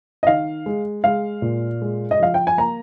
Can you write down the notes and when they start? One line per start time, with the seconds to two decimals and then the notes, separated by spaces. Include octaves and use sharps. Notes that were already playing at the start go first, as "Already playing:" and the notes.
0.23 D#5
0.27 D#3 F5
0.66 G#3
1.04 G#3 F5
1.42 A#2
1.82 G#3
2.11 D#5
2.19 F3 F5
2.34 G5
2.47 G#5
2.57 A#3 A#5